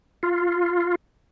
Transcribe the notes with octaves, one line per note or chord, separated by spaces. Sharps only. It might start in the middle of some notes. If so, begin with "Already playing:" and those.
F4